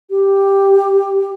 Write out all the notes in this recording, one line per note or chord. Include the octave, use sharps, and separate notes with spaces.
G4